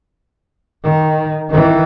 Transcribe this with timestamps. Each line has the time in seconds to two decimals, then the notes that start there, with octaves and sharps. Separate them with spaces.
0.84 D#3
1.50 D#3 E3